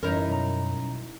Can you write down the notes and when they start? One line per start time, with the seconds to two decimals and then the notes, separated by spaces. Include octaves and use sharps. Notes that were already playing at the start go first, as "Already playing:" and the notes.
0.03 F#2 E3 G3 C#4 D#4 E4 A#4
0.28 B2 F#3 A#5